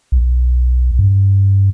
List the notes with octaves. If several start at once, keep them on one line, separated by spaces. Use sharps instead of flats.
B1
G2